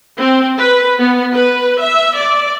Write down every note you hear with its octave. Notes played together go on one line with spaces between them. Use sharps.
C4
B4
B3
B4
E5
D5